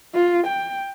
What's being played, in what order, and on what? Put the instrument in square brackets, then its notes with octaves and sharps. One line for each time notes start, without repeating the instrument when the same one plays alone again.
[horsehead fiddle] F4
G5